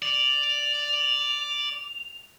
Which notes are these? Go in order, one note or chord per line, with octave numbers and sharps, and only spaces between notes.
D5 F7